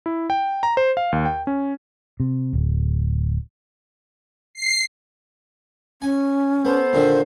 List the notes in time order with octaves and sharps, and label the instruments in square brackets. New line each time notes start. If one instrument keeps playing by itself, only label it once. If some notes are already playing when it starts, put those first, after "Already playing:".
[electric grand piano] E4
G5
A#5
C5
F5
D#2
G5
C#4
[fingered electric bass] C3
D1
[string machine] C7
[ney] C#4 [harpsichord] G#5
[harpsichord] B3 [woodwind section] A4 C5
[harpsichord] A#2 D3 D#3